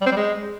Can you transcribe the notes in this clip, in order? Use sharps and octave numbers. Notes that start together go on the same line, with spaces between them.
G3
C4
G3
G#3